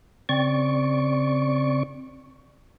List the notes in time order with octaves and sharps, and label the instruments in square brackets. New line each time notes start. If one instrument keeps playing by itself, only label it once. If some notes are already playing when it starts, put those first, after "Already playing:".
[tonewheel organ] C#3 C4 D5 C#6